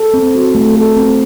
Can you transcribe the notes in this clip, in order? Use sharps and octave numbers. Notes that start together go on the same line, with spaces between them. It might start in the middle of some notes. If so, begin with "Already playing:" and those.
Already playing: A4
C4
F#4
A3
A4
C4